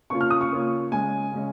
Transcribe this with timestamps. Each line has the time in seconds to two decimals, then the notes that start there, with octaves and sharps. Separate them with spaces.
0.10 C#3 A#3 C#4 F4 C#6
0.21 F6
0.30 D#6
0.41 C#6
0.51 C#3 A#3 C#4 F4
0.91 C#3 G#3 C#4 G#5
1.32 C#3 G#3 C#4